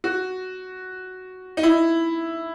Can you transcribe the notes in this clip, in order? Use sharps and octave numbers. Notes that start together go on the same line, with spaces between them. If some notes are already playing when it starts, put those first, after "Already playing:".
F#4
D#4
E4